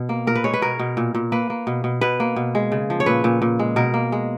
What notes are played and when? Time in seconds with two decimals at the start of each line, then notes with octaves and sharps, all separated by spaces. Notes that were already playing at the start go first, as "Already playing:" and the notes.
Already playing: B2
0.09 A#3
0.27 A#2 A#4
0.35 B4
0.44 G#3 C#5
0.54 B4
0.62 B2 A#4
0.79 B2
0.97 A#2
1.15 A#2
1.32 A#3 B4
1.50 A#3
1.67 B2
1.84 B2
2.01 B2 B4
2.20 A#3
2.36 B2
2.55 G#3
2.72 C#3
2.90 F3
3.00 C#5
3.06 A#2 B4
3.24 A#2
3.42 A#2
3.59 G#3
3.76 B2 A#4
3.94 A#3
4.12 G#3